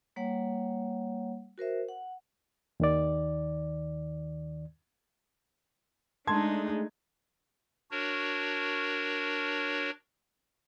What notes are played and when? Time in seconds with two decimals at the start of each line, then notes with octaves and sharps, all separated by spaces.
0.16 G3 A#3 C#5 F#5
1.58 F#4 A#4 C5 E5
1.89 F#5
2.80 D#2 D#3 D5
6.27 G#3 A3 D4 D#4 A5 C6 G#6
7.91 D4 F#4 A#4 C#5